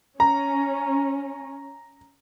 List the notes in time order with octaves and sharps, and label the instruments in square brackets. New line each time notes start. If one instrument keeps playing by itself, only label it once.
[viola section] C#4 [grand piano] A#5